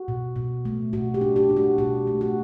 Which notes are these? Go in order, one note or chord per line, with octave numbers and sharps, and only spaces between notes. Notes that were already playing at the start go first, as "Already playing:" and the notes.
Already playing: F#4
B2
B2
A3
B2 F#4
G4
D4
G4
D4
F#4
B2 G4
A3
F#4